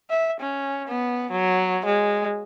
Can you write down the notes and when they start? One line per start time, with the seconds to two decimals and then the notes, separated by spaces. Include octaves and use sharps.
0.10 E5
0.40 C#4
0.88 B3
1.31 F#3
1.86 G#3